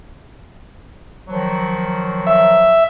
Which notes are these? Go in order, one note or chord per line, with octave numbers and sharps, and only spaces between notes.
D#3 F3 F#3
E5